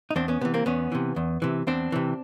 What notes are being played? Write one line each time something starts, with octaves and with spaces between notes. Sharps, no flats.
D#4
E2 C4 D4
B3 C#4
C3 E3 B3
A#3 C4
E2 B3 C#4
C3 E3
E2
C3 E3
E2 C4 D4
C3 E3